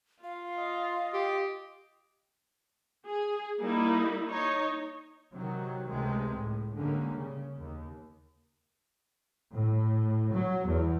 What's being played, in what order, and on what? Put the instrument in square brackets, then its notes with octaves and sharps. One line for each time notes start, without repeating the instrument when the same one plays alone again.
[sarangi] F4 [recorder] F5
[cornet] D#5
[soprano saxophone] G4
[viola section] G#4
G3 A#3 D#4 E4
D#4 C#5
[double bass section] C3 D#3 F#3
C#2 C3 D#3 G#3 A3
A2
G#2 D3 D#3 G3 A#3 C#4
C#3
D#2
A2
F#3
E2